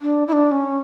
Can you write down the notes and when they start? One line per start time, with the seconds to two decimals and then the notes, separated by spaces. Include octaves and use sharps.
0.02 D4
0.28 E4
0.33 D4
0.52 C#4